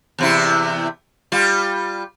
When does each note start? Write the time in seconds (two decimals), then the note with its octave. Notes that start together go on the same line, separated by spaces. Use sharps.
0.19 E2 C3 E4
1.32 G3 F4